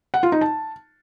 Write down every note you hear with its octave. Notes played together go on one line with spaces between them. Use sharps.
F#5
F4
D#4
A5